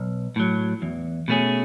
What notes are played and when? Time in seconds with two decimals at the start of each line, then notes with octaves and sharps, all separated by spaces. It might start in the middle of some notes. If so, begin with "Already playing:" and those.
Already playing: B1
0.36 A2 F#3
0.82 E2
1.28 B2 A3 C#4 G#4